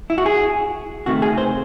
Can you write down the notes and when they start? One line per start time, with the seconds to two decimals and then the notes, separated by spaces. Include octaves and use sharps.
0.10 E4
0.18 F#4
0.26 G#4
1.06 C#2 C3 D#3 A3 F#4
1.22 G#4
1.38 C5